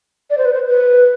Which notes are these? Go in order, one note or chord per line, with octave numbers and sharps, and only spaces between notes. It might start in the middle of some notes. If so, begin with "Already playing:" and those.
D5
C5
B4
C5
B4